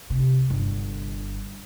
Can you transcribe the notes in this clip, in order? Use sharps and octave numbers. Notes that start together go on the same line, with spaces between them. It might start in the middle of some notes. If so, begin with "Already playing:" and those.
C3
G1